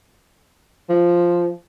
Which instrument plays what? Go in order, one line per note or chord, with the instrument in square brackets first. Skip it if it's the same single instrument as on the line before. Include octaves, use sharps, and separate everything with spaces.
[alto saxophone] F3